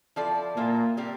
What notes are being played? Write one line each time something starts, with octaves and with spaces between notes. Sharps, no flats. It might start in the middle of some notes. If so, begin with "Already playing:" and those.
F3 C4 E4 A4 D5
A#2 A#3 F4 C5 E5
G3 C4 G4 A#4